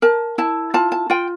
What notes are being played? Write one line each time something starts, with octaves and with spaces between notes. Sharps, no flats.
A#4 A5
E4 A5
F4 A5
A5
F4 G5